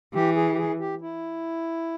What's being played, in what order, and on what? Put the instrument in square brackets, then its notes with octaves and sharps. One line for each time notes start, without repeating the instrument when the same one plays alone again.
[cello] E3 [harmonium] G4
[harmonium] G#4
G4
G#4
G4
E4